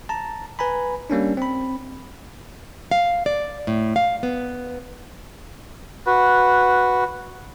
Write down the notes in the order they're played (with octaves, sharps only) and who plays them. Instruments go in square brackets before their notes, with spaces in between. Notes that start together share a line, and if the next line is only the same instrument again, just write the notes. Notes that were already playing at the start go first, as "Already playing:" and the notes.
[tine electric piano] A5 A#5
B4 G#5 A#5 B5
G3 A#3 C#4 D4
C4 B5
[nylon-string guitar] F5
D5
A2
F5
B3
[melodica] F#4 B4